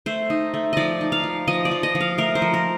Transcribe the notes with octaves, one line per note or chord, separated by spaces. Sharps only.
A3 C5
D#4
A3
F3 D5 D#5
D#4
F5
F3
F3 D#5
D5
F3
D#5
F3
F5
A3 A#4
C5
F3
A#4